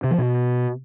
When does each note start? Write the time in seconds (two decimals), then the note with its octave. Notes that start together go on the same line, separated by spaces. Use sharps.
0.04 C3
0.11 F3
0.18 B2